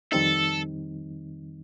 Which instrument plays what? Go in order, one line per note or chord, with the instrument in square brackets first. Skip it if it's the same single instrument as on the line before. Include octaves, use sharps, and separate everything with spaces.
[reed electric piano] F2 D#3 G3 C4 D#4 [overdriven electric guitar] A4